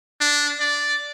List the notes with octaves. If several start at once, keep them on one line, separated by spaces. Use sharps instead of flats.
D4
D5